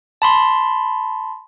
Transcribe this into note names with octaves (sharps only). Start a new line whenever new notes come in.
A5 B5 C6